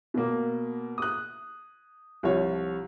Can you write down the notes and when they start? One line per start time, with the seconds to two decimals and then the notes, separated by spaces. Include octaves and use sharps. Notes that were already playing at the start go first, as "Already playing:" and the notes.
0.14 B2 A#3
0.98 D#6 F#6
2.23 C2 F3 C#5